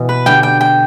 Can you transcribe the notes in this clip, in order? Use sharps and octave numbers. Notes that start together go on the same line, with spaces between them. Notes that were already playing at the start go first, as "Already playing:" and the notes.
Already playing: B2 E3
B4
D3 G3 G5
G5
G5